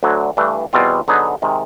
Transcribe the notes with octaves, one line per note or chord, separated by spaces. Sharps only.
D2 D3 F#3
G2 E3 A3 D4
E2 B2 G3 C4 F4
D3 F#3 B3 D#4 G#4
C3 D#3 G#3